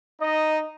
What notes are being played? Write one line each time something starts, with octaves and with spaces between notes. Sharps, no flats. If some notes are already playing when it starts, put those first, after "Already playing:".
D#4 D#5